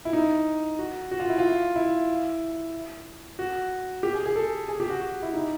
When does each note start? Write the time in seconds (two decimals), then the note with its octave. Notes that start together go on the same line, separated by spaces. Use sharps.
0.05 E4
0.13 D#4
0.79 F#4
1.11 F#4
1.20 F4
1.29 E4
1.39 F4
1.76 E4
3.39 F#4
4.03 G4
4.14 G#4
4.26 G#4
4.36 A4
4.68 G#4
4.80 G4
4.90 F#4
5.01 F#4
5.22 E4
5.33 D#4